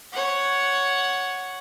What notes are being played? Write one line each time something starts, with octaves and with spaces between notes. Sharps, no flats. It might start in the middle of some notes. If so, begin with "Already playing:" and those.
C#5 F#5